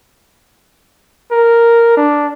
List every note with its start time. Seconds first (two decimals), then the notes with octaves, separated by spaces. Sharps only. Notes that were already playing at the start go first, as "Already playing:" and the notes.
1.31 A#4
1.97 D4